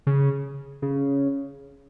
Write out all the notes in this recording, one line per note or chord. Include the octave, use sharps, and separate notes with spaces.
C#3
C#3